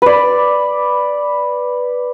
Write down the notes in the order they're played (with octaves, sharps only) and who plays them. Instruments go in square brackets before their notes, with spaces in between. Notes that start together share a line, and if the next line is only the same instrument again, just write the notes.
[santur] B4 D5